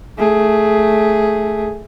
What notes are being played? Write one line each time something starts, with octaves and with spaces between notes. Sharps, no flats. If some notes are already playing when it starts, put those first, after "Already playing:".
A3 G#4